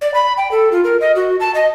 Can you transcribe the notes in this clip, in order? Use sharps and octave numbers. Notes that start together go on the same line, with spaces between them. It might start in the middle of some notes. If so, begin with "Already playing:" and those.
D5
B5
G5
A4
F4
A#4
D#5
F#4
A5
D#5